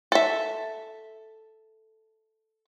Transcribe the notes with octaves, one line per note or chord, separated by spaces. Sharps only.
A4 E5